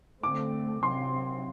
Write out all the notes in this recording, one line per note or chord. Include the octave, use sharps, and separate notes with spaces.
D3 A3 C4 D6
C3 F#3 C4 C6